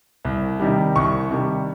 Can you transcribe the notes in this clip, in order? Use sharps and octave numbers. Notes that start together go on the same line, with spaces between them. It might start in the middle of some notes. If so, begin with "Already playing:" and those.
C2
C3 D#3 G3
C2 C#6
C3 D#3 G3